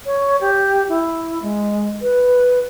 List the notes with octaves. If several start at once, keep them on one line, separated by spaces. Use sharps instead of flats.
C#5
G4
E4
G#3
B4